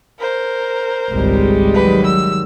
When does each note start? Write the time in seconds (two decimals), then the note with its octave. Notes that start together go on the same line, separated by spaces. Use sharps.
0.19 A#4 C5
1.11 G#1 C#2 G3 G#3
1.74 D#3 F#3 B4
2.06 E6